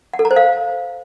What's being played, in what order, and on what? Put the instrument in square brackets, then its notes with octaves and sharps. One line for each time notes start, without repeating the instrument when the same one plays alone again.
[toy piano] F#5
A4
A#5
C5
F5